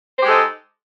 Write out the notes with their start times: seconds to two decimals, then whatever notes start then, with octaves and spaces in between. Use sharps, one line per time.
0.19 C5
0.22 G4
0.24 G#3
0.27 A4
0.30 D#4